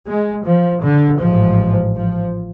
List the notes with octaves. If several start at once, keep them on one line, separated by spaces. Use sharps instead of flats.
G#3
F3
D3
A1 G#2 F3
F3